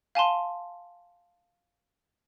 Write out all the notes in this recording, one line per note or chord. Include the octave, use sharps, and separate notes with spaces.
F5 G#5 A5 C6